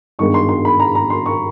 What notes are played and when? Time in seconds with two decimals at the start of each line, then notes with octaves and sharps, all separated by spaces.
0.19 G2 D#3 G#3 B3 C#6
0.34 C6
0.49 C6
0.65 B5
0.80 A#5
0.95 A#5
1.10 C6
1.26 C#6